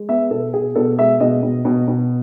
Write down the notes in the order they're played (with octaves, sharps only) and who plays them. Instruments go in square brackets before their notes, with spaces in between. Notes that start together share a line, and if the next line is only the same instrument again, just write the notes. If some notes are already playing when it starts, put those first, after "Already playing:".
Already playing: [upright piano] G#3
B3 E5
B2 A4
B2 G#4
B2 A4
G#3 E5
B2 D#5
B2
B2
B2